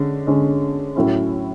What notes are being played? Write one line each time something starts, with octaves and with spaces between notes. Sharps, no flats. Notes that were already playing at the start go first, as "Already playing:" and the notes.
Already playing: D3 G#3 C#4
D3 G#3 C#4
A2 F#3 C#4 E4